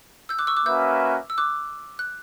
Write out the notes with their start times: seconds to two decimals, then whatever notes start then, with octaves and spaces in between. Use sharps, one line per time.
0.29 E6 G6
0.39 D6 F#6
0.47 C#6 E6
0.57 D6 F#6
0.65 A#3 C#4 F#4 B4 E5 E6 G6
1.30 E6
1.38 D6 F#6
1.99 F#6